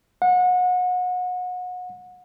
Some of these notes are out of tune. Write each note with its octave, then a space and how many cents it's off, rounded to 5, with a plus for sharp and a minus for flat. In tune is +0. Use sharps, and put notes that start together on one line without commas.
F#5 -30